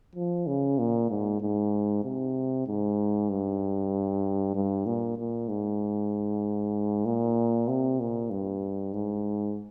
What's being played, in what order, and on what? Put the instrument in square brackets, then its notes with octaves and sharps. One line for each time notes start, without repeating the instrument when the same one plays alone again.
[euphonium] F3
C#3
A#2
G#2
G#2
C3
G#2
G2
G2
A#2
A#2
G#2
A#2
C3
A#2
G2
G#2